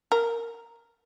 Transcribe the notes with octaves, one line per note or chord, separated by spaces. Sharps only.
A#4